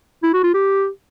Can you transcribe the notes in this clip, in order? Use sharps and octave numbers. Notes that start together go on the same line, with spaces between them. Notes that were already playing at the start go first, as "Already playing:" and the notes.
E4
F#4
F4
G4